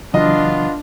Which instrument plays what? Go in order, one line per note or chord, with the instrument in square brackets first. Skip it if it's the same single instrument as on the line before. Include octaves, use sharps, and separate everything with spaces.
[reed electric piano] C#3 E3 F#3 [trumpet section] B3 F4 [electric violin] D4 [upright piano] D#5